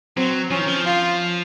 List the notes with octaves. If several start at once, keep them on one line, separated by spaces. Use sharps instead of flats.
F#3 C4
F3 C#4
D#3
F3
F4